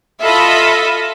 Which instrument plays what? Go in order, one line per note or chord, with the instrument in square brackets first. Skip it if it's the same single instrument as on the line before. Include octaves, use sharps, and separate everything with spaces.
[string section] F4 A4 D#5 E5 B5